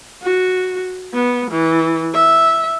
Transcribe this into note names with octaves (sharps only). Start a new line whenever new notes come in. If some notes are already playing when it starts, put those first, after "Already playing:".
F#4
B3
E3
E5